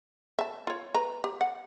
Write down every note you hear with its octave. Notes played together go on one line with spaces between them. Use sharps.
E5 A5
F4 C#5
B4 A#5
G4
F#5